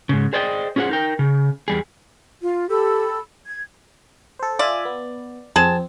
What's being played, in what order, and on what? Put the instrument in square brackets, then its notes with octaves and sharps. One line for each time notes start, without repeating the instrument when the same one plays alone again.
[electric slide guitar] G#2 C#3
G#4 C5 D5 D#5 G5
C#4 F4 G#4 C5 F#5
D#4 A#4 G5
C#3
E2 G3 G#4
[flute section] F4
G4 A4 B5 E6
G#6
[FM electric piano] A4 C5
[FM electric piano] F4 E5 G#5 [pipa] D5
[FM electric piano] B3
[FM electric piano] F2 C4 [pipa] G#4 A5